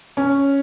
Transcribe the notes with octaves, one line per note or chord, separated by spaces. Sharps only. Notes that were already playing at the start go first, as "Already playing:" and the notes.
C#4